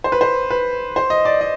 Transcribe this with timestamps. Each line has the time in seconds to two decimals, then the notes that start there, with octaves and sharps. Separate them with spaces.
0.04 C5
0.12 B4
0.21 C5
0.50 B4
0.96 C5
1.10 D#5
1.25 D5
1.41 D#5